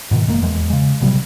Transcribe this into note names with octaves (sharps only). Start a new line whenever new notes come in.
G#2 B2 D3 D#3
F#1 G#3 A#3
D1 E2 G3 G#3
C#3 G#3
A1 C3 F#3 G3